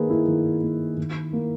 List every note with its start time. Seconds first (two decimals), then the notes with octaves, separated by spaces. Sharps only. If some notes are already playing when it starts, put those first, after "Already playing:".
Already playing: D#3 A#3 G#4 B4
0.10 E4
0.28 D#3
0.63 A#3
0.97 D#3
1.33 A#3